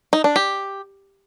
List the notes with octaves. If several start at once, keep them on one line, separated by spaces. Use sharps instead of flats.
D#4
D4
G4